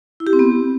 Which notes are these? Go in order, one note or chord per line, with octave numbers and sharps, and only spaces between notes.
E4
G4
C4
B3